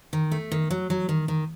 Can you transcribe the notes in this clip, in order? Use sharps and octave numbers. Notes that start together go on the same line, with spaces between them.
D#3
A3
D#3
F#3
F#3
D#3
D#3